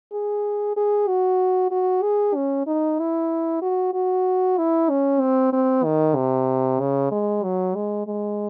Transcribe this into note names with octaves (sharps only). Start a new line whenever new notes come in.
G#4
G#4
F#4
F#4
G#4
C#4
D#4
E4
F#4
F#4
E4
C#4
C4
C4
D#3
C3
C#3
G#3
F#3
G#3
G#3